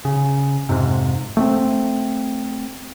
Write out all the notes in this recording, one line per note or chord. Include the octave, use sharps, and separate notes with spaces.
C#3
F2 G#2 C3
A3 B3 C4